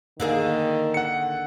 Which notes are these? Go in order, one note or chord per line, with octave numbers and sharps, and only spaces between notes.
D3 D#3 A#3 G#4
F#5 C#7